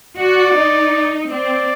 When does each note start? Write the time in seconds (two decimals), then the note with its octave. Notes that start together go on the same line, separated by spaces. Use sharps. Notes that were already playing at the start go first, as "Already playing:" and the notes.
0.18 F#4 D5
0.55 D#4
1.30 C4 D5